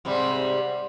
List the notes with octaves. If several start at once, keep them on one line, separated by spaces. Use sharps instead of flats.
G#2 C3 G3